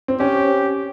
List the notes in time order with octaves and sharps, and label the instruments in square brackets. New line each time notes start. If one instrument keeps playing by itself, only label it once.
[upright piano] C4
[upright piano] C#4 [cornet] G4